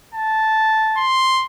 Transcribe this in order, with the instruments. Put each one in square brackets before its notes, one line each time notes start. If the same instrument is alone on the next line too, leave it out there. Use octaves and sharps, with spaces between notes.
[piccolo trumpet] A5
[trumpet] C6